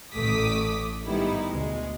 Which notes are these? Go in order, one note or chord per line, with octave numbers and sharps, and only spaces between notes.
A1 A3 D6 D#6 B6
G#2 D#3 G3 B3 D#4 E4
D2 B2 G#3